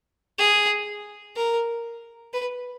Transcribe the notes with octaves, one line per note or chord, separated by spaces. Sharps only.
G#4
A#4
B4